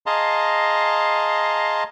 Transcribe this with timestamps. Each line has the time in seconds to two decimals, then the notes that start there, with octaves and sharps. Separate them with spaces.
0.06 G#4 D#5 F5 A5 A#5 C6